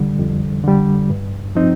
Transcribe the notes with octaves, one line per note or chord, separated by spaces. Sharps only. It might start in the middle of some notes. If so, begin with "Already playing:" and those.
Already playing: F2 D3 G3
F2
D3 G3
G2
F3 C4 D#4